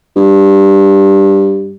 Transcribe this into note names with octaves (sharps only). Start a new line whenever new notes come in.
G2